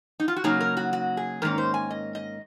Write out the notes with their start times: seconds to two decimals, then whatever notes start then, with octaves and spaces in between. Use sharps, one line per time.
0.20 D#4
0.28 F4
0.36 F#4
0.44 C#3 F#3 A#3 D#4 G#4
0.61 A#4
0.77 F#4
0.93 F#4
1.17 G#4
1.42 G#2 D#3 A#3 C#4 A#4
1.58 C5
1.74 G#5
1.91 D#5
2.15 D#5